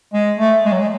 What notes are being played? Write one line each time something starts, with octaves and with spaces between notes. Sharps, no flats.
G#3
A3
G#3
F#3
G#3